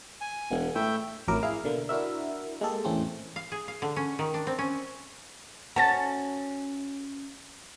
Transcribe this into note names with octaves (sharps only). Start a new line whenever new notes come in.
G#5
E1
A2 E5 G5
A1 F2 F#3 E4 A#4 D6
E4 G#4 F5
B2 D3 A#3
D4 E4 F#4 A#4 E5
G#3 A#3 G4 A4
E2 A2 E3 A3 C4 C#4
F5
G#4
F5
D3
C#4
D#3
D4
C4
C#4
C#4 F#4 A5 A6